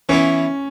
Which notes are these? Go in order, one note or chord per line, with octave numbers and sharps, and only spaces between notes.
E3 B3 C#4 E4